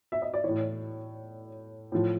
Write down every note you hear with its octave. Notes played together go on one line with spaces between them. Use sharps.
E5
D#5
D5
E3 C#5
A2
A2 F3